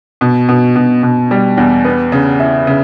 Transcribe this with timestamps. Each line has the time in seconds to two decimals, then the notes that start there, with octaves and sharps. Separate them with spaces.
0.21 B2
0.49 B2
0.76 B2
1.03 B2
1.31 G3
1.57 E2
1.85 B3
2.12 C#3
2.40 E4
2.67 C#3